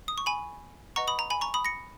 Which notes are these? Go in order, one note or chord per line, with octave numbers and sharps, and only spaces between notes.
D#6
C#6
G#5 B5
B4 D#5 F#5 A#5 C#6
B5 D#6
A#5
G#5 B5
A#5 C#6
B5 D#6
A#6 C#7